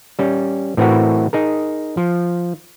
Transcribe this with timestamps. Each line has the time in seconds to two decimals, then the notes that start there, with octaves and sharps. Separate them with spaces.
0.19 G3 C#4
0.77 A2 E3 C4 E4 F#4 A#4
1.33 D#4 G#4 A#4
1.97 F3